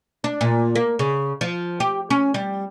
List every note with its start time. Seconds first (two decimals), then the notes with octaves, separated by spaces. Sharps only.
0.24 D4
0.41 A#2
0.75 A#3
0.99 C#3
1.41 F3
1.80 G4
2.10 C#4
2.34 G3